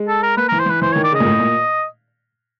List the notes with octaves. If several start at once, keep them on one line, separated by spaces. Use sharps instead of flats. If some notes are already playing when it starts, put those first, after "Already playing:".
Already playing: G#3
A4
A#4
A#3 B4
A#4
E3
C5
E3 B4
E3 C5
C#5
D#3
D5
C#3 D#5
A#2
A2
A#2